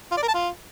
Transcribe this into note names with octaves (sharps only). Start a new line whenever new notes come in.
F4
D5
A#4
A5
F4